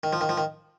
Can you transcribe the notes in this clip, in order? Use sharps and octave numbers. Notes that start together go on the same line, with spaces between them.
D#3
F3
D#3
F3
D#3